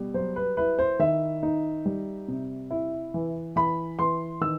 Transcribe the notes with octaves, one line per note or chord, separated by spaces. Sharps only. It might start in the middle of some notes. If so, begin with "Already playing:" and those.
Already playing: B2 G3
F#3 C5
B4
E4 B4
C5
D#3 E5
D#4
G3
C3
E4
E3
E3 B5
E3 C6
D#3 E6